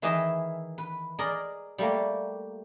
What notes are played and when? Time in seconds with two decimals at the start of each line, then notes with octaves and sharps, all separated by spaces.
0.02 D#3 E3 G#4 B4 D#5 E5
0.78 B4
1.19 G#4 A#4 D5 D#5
1.78 G3 A3 A#3